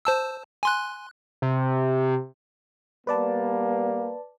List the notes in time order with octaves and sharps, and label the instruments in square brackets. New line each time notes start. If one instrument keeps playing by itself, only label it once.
[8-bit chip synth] C5 A5 E6
G#5 C6 F#6
[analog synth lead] C3
[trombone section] G3 A#3 B3 [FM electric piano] B4 D5 A5